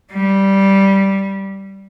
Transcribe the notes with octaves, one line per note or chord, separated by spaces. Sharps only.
G3